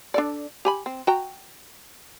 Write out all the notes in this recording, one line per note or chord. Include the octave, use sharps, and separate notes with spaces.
D4 A4 D5
G4 G#5 B5
C4
F#4 G5 A#5